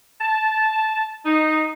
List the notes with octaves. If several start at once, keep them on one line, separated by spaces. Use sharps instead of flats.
A5
D#4